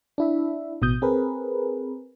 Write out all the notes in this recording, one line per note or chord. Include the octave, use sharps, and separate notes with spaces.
D4 E4 E5
A1 B2 D#6 G6
C4 G#4 A#4 B4